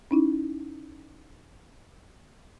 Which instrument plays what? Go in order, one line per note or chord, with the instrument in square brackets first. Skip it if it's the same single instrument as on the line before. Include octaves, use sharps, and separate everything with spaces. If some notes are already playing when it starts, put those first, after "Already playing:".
[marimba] C#4 D#4 E4